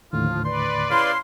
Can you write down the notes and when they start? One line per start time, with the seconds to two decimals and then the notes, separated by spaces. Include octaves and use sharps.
0.13 D#2 A2 D3 F3 F4
0.45 B4 D5 C6
0.90 C#3 E4 F5 C6